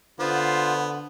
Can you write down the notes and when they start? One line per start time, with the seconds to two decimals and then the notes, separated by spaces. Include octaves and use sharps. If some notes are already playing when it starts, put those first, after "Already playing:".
0.20 D3 B3 F4 C5